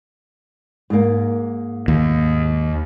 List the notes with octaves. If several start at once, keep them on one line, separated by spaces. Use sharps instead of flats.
G#2 A#3
D#2